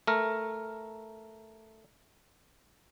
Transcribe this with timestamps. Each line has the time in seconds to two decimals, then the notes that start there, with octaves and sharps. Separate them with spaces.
0.07 A3 A#4